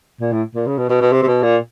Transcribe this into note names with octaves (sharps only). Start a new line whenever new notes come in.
A#2
A2
A#2
C#3
B2
B2
B2
C3
C3
B2
A#2